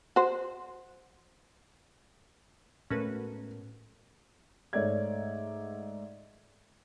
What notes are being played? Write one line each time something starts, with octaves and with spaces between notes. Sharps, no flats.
F#4 C5
A2 G#3 A3 B3 C#4 F#4 A#4 B4
G#2 A3 C#5 D5 E5 G#6